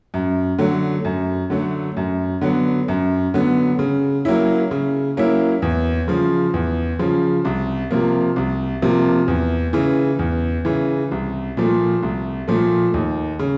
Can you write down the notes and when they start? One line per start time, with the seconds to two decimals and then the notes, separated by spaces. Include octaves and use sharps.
0.14 F#2
0.59 D3 F#3 A3
1.05 F#2
1.50 D3 F#3 A3
1.97 F#2
2.41 D3 F#3 B3
2.88 F#2
3.34 D3 F#3 B3
3.79 C#3
4.25 F#3 A#3 C#4 E4
4.71 C#3
5.17 F#3 A#3 C#4 E4
5.62 E2
6.08 C#3 F3
6.54 E2
6.99 C#3 F3
7.45 C2
7.91 C3 F3 A#3
8.36 C2
8.82 C3 F3 A#3
9.28 E2
9.73 C#3 E3
10.19 E2
10.65 C#3 E3
11.11 C2
11.57 A#2 F3 A3
12.03 C2
12.48 A#2 F3 A3
12.94 D#2
13.39 C#3